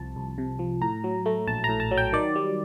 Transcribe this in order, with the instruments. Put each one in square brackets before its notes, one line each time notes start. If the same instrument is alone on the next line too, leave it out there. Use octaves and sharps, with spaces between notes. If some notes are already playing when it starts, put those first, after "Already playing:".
Already playing: [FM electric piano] C2 C3 F3 A5
C2
C3
F3
A2 A#5
F#3
A3
A#1 A5
A2 A#5
A5
F#3
G5
D#3 D5
G3